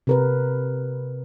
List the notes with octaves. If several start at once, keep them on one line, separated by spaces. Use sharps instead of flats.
C3 A#4 B4